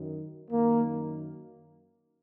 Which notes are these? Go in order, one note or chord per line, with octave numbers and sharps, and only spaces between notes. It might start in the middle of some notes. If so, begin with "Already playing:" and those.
Already playing: F#2 D#3
F#2 D#3 A#3